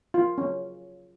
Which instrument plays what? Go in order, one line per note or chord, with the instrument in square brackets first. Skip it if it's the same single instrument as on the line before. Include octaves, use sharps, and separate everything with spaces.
[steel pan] F4
C#4